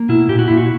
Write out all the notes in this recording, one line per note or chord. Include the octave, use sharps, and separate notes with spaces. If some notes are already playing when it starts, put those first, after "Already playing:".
Already playing: A#3
B2 E4
A#2 G4
F#4
A#2 E4
F#4